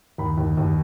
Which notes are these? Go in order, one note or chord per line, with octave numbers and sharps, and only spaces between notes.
D#2 B5
D#2
D#2